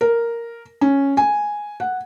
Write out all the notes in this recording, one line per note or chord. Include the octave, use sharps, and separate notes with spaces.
A#4
C#4
G#5
F#5